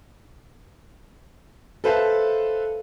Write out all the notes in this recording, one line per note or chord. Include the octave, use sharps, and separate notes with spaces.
A4 B4 C5 E5 F5 A5